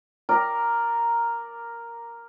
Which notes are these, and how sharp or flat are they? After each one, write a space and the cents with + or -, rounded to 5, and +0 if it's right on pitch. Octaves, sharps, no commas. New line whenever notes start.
A#4 +0 D5 +0